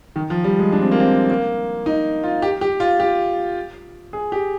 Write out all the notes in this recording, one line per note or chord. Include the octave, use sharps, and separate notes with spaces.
D#3
F3
G3
G#3
D4
C4
A#3
C4
A#3
D#4
F4
G4
G4
F4
G4
G#4
G4